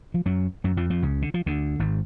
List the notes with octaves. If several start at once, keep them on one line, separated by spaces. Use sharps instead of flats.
F3
F#2 F#3
F#2 F#3
F2 F3
F2 F3
C#2 C#3
D3
F3
D2 D3
G#1 G#2